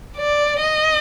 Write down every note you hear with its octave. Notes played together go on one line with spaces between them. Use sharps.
D5
D#5